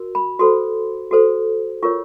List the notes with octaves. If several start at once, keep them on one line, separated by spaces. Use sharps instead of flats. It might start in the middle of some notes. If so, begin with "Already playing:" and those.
Already playing: F#4 A#4
B5
F#4 A4 C5 C6
F#4 A4 C5
F4 A#4 C#5 C#6